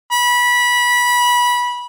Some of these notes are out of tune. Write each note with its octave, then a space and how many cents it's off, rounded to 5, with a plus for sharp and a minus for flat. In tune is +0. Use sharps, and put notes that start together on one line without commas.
B5 -20